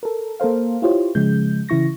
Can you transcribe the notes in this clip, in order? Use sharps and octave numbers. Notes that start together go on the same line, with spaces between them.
A4 A#4
A#3 A4 A#4 C5 F5
E4 F4 G4 C5 C#5
C#3 F3 G#3 G6
C#3 E3 E4 C#6 A#6